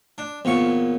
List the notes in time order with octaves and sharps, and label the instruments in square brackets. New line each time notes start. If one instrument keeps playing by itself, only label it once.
[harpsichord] D4
[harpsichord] E2 A#2 C#6 [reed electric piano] C4 F4 C#5